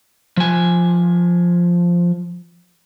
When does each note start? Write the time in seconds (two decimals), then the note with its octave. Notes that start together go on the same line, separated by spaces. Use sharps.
0.37 F3 G#5